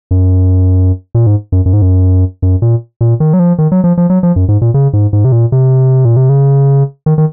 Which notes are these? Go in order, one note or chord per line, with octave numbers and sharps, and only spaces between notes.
F#2
A#2
G#2
F#2
F#2
G#2
F#2
F#2
A#2
A#2
D#3
F#3
F3
D#3
F#3
F3
F3
F#3
F3
F#2
G#2
A#2
C#3
G#2
G#2
C3
A#2
C3
A#2
C3
C#3
D#3
D#3